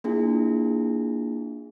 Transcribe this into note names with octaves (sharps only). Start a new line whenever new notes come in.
A#3 D4 E4 F4 G#4